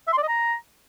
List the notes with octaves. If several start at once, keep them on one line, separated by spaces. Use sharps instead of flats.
E5
C6
D5
D#5
A#5